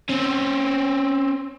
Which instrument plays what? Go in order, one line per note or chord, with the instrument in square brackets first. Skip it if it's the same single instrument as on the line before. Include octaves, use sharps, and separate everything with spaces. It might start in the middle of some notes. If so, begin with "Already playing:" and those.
[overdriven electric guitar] C4 C#4